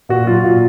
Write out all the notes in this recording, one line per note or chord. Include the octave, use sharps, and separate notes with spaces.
A#2 F#4
F#3 F4
A#2